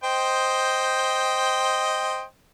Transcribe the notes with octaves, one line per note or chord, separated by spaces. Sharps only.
C5 D#5 G5